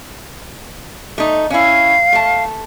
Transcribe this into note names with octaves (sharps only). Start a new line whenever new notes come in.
A3 D#4
C#4 E4 F5
A3 A5